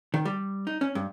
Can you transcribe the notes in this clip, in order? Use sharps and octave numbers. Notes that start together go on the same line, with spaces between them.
D#3
G3
D#4
C#4
G2